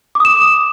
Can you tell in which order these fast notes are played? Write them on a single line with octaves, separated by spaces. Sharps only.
D6 D#6 E7